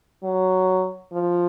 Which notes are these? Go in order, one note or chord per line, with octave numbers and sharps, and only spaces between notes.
F#3
F3